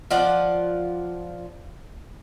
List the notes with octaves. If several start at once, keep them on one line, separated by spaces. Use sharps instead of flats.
F3 D5 F#5